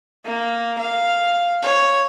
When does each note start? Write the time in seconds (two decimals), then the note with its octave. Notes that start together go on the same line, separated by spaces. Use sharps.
0.25 A#3
0.79 F5
1.62 C#5